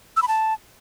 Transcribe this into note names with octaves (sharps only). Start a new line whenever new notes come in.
E6
B5
A5